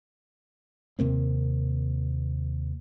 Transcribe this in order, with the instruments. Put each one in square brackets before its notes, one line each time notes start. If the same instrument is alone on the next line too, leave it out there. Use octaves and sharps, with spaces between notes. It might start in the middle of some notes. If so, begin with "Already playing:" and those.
[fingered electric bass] D#2 C3 A#3 C4